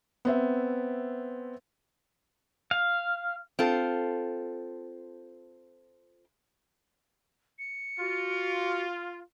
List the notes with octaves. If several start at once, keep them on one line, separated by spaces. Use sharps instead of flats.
B3 C4 E5
F5
C4 F4 A4
C#7
F4 F#4